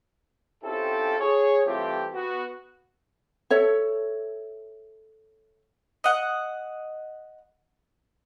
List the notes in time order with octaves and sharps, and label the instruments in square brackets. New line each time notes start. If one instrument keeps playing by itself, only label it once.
[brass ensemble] C4 C#4 E4 F4 G4 A4
G#4 C#5
E3 G3 A3 C4 F4 G4
B3 F#4
[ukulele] A4 C#5 E5
[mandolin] D#5 F#5